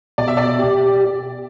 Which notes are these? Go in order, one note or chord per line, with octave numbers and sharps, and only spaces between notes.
B2 D5
E5
D5
G4